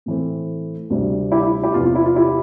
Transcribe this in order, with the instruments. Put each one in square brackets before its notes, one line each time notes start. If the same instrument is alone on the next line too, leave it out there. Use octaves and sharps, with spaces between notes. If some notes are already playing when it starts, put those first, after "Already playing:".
[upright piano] A2 E3 A3 C4
D2 C3 G3 C4
E4 G4
E4
E4 G4
E2 C3 F3 F4
F4
E4
F4
E4 G4